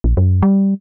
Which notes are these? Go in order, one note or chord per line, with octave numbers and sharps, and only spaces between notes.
A#1
F#2
G3